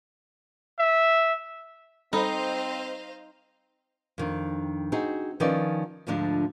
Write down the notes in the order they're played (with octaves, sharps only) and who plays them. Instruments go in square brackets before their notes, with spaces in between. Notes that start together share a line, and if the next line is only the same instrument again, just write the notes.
[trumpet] E5
[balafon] G3 A4 B5 [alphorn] C4 [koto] D#4 [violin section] C5 D#5 F5
[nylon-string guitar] F2 D#3 D4
C4 D#4 F#4 G#4
D#3 F3 C#4 D#4 B4 D5
D2 G#2 D3 F3 D4 F4